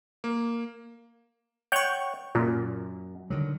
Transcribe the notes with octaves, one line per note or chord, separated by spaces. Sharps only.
A#3
C#5 F#5 G5 C#6 G6
F#2 A#2
D3 D#3 F#3